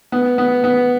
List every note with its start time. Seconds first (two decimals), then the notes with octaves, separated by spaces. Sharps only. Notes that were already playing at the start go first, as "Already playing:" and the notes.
0.12 B3
0.38 B3
0.64 B3